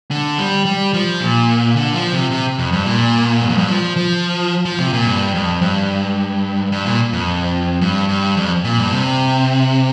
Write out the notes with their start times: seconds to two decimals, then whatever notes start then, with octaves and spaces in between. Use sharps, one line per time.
0.11 D3
0.38 G3
0.66 G3
0.94 F3
1.21 A#2
1.76 D3
1.94 F3
2.13 C3
2.31 C3
2.59 F2
2.72 G2
2.86 A#2
3.41 G2
3.49 F2
3.58 G2
3.69 F3
3.97 F3
4.65 F3
4.79 C3
4.93 A#2
5.07 G2
5.34 F2
5.62 G2
6.72 G2
6.85 A#2
7.13 F2
7.81 G2
8.09 G2
8.37 F2
8.64 A#2
8.78 G2
8.92 C3